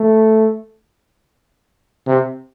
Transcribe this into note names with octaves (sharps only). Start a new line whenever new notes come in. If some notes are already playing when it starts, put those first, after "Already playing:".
Already playing: A3
C3